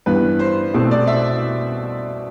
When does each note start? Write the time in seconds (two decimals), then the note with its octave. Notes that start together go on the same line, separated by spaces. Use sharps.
0.06 G2 E3 G3 B3 B4
0.39 C5
0.74 C2 B2 A3 C4 C5
0.91 D5
1.07 E5